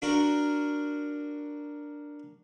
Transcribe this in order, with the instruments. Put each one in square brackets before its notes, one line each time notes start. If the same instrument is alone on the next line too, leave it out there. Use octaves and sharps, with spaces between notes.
[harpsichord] D4 F#4 A#4